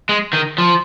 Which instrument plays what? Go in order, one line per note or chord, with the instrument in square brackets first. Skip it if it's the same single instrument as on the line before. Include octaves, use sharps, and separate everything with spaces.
[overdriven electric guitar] G#3
D#3
F3